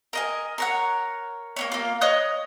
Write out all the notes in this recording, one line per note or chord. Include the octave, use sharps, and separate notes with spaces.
A#4 D#5 G#5
A#4 C#5 F#5
A#3 B3 C#5
A#3 F4
C#5 D#5 D#6 F#6